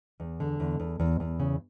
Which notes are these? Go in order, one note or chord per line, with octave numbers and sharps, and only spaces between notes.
E2
D3
E2
E2
E2
E2
C#3